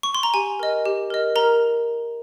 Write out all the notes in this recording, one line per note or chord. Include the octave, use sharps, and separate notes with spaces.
C#6
C6
A#5
G4 G#5
A#4 D#5
G4
A#4 D#5
A#4 A#5